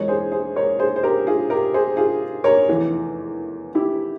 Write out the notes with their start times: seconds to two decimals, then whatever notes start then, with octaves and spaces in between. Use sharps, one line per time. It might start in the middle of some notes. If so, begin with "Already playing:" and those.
Already playing: E1 E2 E3 G#3 A#4 C#5
0.08 G#4 C5
0.32 G#4 C5
0.56 A#4 C#5
0.79 G#4 C5
0.96 C5
1.03 G4 A#4
1.27 F4 G#4
1.50 G4 A#4
1.74 G#4 C5
1.97 F4 G#4
2.44 A#4 C#5
2.68 F1 E2 E3
3.75 E4 G4